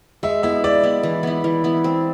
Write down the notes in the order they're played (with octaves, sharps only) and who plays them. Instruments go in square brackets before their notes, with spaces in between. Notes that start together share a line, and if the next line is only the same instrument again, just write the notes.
[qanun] G#3 [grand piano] E5
[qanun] B3 E4 [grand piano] E5
[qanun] G#3 [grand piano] D5
[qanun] B3 E4
E3
B3 E4
E3
B3 E4
C4